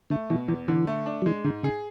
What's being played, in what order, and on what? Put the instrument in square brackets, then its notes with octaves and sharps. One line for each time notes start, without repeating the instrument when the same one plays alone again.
[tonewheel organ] D3 [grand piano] A3
[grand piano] B2 [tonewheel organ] E3
[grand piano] E2 [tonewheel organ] E3
[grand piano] D3 [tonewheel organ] E3
[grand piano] A3
D4
[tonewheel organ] F#3
[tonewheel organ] E3 [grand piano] G#3
[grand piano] G#2 [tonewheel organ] D3
[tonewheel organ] C#3 [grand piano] G#4